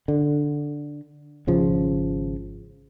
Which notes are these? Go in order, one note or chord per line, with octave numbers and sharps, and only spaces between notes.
D3
G#1 C#3 F3